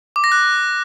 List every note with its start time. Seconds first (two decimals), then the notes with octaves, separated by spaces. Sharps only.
0.16 D6
0.24 A#6
0.32 F#6